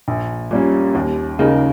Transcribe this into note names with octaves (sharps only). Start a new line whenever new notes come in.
A#1
A#2 G3 A#3 C#4
D#2
C#3 G#3 D#4 A#4